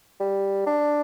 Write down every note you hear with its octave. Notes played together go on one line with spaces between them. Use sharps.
G3
D4